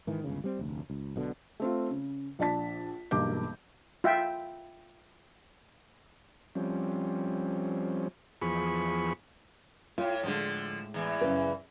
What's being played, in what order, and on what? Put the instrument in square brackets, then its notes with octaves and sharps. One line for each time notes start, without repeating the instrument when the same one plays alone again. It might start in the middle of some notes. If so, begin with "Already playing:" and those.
[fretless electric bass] G#2 D#3 E3
G1 C#2 C#3
G3 C4
F1 D2
C#2
B1 B2 D3
[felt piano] A3 C4 F4
C#3
A#1 D4 D5 A5 B6
E1 B1 G2 A#3 D6 G6
[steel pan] F4 E5 G5
[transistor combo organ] F3 G3 C4 C#4
E2 F3 G#4 B5 C#6
[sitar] A2 [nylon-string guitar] F4
[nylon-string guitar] A2 G#3 [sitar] D3 F3
[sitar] E2 E3
[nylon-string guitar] F#2 C#3 B4